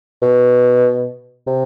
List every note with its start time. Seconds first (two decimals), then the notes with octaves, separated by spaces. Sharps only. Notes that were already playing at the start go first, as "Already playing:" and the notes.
0.22 B2
1.47 C3